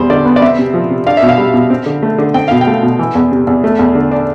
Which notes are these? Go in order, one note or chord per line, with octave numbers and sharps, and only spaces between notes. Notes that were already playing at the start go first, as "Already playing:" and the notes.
Already playing: E2 G3 C5
D3 D5
B3
D5
C4 E5
C3
F3
C3
D4 F5
E5
B2
F5
G3
B2
C4
D3
A3
D3
C4 G5
B2 F5
G5
A3
B2
E3
E2
C3
E2
A3
E2
D3
D4